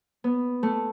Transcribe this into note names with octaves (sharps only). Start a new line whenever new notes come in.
B3
A3